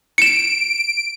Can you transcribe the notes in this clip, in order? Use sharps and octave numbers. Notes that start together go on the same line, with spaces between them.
C#7 D7 E7